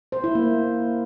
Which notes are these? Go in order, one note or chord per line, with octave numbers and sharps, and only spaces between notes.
C5
E4
A#3